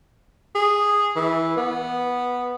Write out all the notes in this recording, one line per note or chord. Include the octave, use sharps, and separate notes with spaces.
G#4
E3
B3